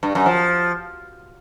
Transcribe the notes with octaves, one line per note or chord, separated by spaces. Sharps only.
G2
F#2
F3